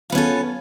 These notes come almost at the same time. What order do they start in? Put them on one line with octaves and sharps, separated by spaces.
F4 B3 C#4 A4